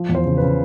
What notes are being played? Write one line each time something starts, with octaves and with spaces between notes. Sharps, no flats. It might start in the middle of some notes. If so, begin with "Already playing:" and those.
Already playing: F3
E2
C5
C#3
B4
C#3